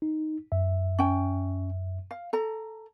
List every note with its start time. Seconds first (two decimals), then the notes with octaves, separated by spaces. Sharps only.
0.02 D#4
0.52 F#2 E5
0.99 C#4 G5
2.11 F5
2.33 A4 A#5